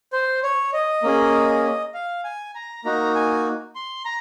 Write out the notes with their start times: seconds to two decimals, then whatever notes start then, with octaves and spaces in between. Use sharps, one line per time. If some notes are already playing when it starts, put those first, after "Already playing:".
0.13 C5
0.43 C#5
0.73 D#5
1.03 A#3 C#4 G#4
1.94 F5
2.24 G#5
2.55 A#5
2.85 A#3 D#4 F#4 A#5
3.15 G#5
3.75 C6
4.05 A#5